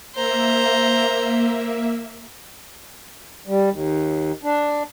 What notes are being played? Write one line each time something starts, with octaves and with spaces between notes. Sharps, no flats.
A#3 C5 E5 A#5
G3
D#2
D4